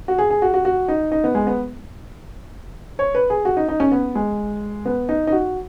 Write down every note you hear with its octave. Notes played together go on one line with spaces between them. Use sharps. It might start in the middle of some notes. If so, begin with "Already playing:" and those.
F#4
G#4
G#4
F#4
F#4
F#4
D#4
D#4
B3
G#3
B3
C#5
B4
G#4
F#4
D#4
D#4
C#4
B3
G#3
B3
D#4
D#4
F#4